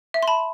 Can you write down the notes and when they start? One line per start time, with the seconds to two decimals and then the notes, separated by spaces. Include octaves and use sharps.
0.14 E5
0.23 C6
0.28 A5 B5